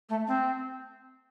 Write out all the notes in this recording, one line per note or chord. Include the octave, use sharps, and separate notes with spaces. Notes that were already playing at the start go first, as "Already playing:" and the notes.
A3
C4